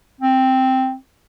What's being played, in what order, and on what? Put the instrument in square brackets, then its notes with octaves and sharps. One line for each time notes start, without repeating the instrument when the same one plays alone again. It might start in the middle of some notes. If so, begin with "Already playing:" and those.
[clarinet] C4